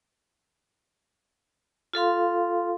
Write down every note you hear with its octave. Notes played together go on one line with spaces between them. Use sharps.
F4 A4 F5 C6